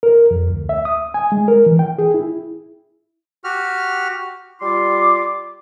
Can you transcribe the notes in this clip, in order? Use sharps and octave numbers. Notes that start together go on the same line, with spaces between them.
A#4
F2
D2
E5
D#6
G#5
G#3
A#4
E3
G5
G#4
E4
F#4 G4 F6
G3 F4 C6 D6